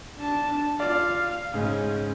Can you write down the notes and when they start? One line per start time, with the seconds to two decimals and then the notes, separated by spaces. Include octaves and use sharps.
0.17 D4 A5
0.80 F4 D5 F5
1.54 G#2 C#3 G#3 C#4